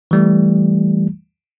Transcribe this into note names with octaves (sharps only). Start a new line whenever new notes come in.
E3 G3 A3